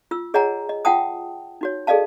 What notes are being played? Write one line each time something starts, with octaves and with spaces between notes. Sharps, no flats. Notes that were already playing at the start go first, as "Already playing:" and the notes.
F4 E6
G#4 C#5 D#5 F#5 G#5 A#5
D#5
F4 F#5 G5 A5 D#6
D#4 F#4 C#5
G#4 A4 D5 D#5 F5 A5